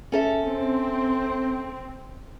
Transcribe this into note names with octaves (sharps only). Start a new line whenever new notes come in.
C#4 A4 E5
C4